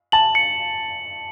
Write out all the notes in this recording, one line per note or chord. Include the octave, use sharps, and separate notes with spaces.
A5 F#7
C#7